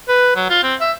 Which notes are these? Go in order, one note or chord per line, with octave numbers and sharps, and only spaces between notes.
B4
F#3
F4
C4
E5